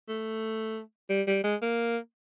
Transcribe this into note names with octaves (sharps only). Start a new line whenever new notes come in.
A3
G3
G3
G#3
A#3